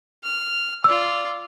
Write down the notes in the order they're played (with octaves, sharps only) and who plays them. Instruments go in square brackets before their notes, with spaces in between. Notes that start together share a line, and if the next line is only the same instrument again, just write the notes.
[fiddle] F6
[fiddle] F4 D5 [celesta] E6